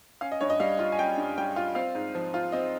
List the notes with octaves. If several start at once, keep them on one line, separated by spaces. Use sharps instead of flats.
C#4 F5
D#5
G2 C#5
D#5
G3 F5
F4
G#5
C#4 G5
G2
G3 G5
F4
C4 F5
G#2
F3
F4
C4 D#5